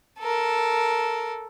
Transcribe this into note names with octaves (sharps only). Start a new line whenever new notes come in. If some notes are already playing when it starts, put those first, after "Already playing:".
A4 A#4